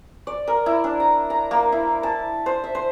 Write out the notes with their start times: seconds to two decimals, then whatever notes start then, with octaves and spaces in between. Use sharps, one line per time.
0.27 D5
0.48 A#4
0.66 E4
0.84 D4
1.00 A#5
1.30 A#5
1.51 A#3
1.72 E4
2.03 A5
2.46 C5
2.64 E5
2.75 C5